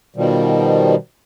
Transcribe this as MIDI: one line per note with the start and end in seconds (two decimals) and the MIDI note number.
0.16 0.95 47
0.16 0.95 51
0.16 0.95 53
0.16 0.95 55